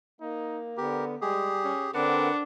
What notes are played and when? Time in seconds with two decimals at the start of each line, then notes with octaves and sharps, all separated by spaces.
0.21 A#3 D#4
0.77 D3 B3 G4 A#4
1.21 G3 G#3 G4 G#4
1.64 C#4
1.94 D3 C4 D4 A#4 B4 F#5